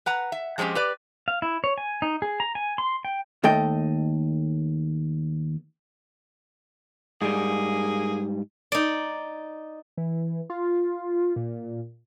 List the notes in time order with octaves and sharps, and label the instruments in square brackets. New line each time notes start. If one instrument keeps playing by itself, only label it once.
[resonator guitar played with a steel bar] B4 F#5 A#5
E5
F3 G#3 C4 C#4 G4
G4 B4 D5
[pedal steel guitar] F5
E4
C#5
G#5
D#4
G#4
A#5
G#5
C6
G5
[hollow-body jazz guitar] D#2 A3 A4 D#5 G5
[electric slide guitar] G#2 G3 [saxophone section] A#3 G#4
[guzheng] D#4 D5
[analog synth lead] E3
F4
A#2